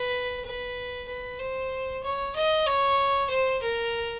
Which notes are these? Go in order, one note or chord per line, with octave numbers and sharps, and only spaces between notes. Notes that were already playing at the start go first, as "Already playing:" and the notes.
Already playing: B4
B4
B4
C5
C#5
D#5
C#5
C5
A#4